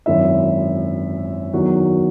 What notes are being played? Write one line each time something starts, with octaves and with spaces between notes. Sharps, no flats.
G#1 F#2 E3 E5
E2 D#3 F#3 F#4